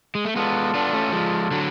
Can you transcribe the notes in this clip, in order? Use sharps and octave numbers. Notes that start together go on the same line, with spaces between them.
G#3
A3
G#3 B3 F4 A4 D5
B3 D4
A3 C#4
F3 G#3
D3 F#3